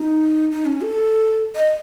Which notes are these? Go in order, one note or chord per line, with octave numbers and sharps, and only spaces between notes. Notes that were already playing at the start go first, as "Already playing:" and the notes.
Already playing: D#4
D#4
C#4
A4
D#5